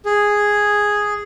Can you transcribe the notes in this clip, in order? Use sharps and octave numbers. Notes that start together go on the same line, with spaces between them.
G#4